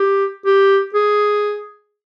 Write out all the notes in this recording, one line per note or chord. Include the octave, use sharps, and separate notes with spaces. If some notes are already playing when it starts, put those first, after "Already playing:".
Already playing: G4
G4
G#4